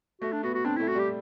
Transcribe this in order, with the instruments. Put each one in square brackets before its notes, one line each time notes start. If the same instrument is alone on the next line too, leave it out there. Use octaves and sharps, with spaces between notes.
[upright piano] A3 [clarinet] F#4
[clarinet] D4
[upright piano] B3 [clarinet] F#4
[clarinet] F#4
[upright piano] C4 [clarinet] D4
[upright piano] A3 [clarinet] E4
[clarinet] F#4
[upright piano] G3 [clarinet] G4